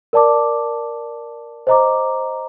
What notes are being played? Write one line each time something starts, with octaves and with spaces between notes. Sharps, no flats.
A#4 D5 A5 D6
C5 D#5 A#5 D6